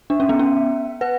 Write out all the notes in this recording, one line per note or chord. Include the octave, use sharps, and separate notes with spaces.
D4 E5
C#4
B3
C#4
B4 F#5